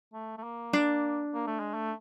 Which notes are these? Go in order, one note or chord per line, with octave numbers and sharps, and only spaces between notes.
A3
A3
A#3
D4
A#3
A3
G#3
A3